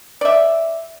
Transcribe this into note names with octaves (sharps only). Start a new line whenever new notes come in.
D5 E5